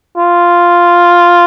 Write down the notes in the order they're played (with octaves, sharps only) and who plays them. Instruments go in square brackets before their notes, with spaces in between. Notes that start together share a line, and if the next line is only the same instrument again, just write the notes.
[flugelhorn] F4